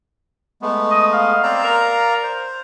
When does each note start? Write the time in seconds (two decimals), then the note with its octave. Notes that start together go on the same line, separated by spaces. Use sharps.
0.62 G#3 A3 B3
0.91 D#5
1.13 F5
1.43 C4 D5 F5 A#5
1.64 A#4
2.23 C5